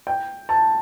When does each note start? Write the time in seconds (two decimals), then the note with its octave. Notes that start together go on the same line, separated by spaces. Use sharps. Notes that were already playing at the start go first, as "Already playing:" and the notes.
0.07 G5
0.49 A5